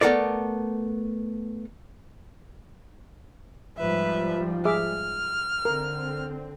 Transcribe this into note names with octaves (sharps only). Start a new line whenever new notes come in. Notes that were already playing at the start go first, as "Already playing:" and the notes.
A3 B3 A4 A#4 D5
G#2 F3 G3 B4 E5
G#4 E5 D6 F6
D3 C4 A#4